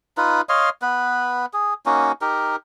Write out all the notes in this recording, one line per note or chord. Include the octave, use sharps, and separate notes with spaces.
D#4 F4 B4
C#5 D#5 F5 C6
B3 B4
G#4
A#3 C#4 D#4 F#4
D#4 G4 A#4